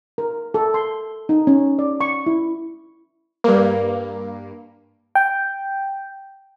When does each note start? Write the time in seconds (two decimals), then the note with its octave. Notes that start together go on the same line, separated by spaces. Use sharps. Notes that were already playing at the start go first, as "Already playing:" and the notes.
0.18 A#4
0.54 A4
0.74 C6
1.29 D#4
1.47 C#4
1.79 D5
2.01 C#6
2.26 E4
3.44 G2 A#3
5.15 G5